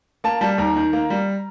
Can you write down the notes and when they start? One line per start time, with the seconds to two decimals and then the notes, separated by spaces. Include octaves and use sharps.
0.24 A#3 A5
0.41 G3 A5
0.58 D#2 A#5
0.76 D#3
0.93 A#3
1.10 G3